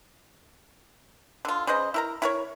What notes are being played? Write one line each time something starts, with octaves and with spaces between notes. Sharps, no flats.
D3 F4
C#3 B4 C5 D#5
E4 A#4 A#5
E4 A#4 C#5